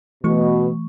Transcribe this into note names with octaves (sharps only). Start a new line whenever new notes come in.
B2 E3 A3 C#6